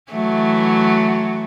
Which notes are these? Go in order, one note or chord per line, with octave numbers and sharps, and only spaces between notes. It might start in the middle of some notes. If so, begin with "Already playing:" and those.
E3 F#3 A3